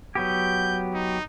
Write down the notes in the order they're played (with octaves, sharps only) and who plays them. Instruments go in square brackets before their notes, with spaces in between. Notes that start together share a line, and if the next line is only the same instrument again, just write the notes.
[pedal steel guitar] F#3 B3 G4 [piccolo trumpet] G6
[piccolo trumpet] D#4